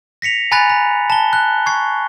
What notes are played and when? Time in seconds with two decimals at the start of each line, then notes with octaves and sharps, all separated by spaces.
0.22 A#6 B6 C#7 F7
0.51 G#5 A#5 B5 F#6 A6 F7
0.69 A#5
1.10 A5 G7
1.33 F#6
1.66 C#6 G#6 C7